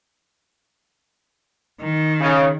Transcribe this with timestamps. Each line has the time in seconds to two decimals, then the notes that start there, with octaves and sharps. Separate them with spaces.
1.81 D#3
2.21 C#3